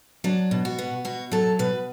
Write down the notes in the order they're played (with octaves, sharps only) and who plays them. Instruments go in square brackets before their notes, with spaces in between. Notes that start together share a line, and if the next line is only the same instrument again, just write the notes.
[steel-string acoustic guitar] F#3 D4
B2
F#4
B3
B2 F#4
F#3 A4
B2 B4